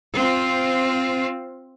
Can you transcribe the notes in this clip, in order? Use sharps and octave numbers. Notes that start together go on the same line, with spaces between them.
C4 F4